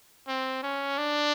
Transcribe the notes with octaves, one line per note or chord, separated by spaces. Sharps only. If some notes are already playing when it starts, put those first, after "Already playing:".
C4
C#4
D4